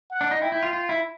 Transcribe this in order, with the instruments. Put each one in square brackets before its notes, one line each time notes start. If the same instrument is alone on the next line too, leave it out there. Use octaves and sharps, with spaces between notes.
[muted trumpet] F#5
[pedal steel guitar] D4
D#4
[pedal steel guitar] E4 [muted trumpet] G5
[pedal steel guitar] E4
F4
F4
E4